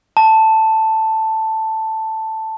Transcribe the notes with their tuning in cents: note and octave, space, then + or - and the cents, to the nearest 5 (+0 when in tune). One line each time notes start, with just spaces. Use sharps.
A5 +5